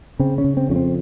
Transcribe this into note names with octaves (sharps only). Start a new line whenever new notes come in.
C#3 C4
C#4
C#3
C4
F2 C#4
C4